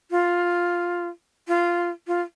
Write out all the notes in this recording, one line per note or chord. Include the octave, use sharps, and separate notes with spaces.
F4
F4
F4